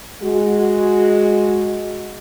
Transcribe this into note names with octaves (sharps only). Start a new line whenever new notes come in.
G#3 F#4